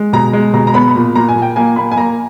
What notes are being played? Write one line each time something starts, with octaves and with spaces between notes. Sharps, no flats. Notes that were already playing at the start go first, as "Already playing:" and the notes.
Already playing: G#3
B2 A#5
G#3
B2 A#5
A#5
B3 B5
B5
A#2
A#2 A#5
G#5
A#2
G5
A#3 G#5
A#3 B5
G#5
A#3 A#5